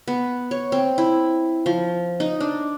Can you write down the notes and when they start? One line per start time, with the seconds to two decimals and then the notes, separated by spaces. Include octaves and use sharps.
0.08 B3
0.51 C#5
0.72 C4
0.98 E4
1.66 F3
2.20 D#4
2.40 D4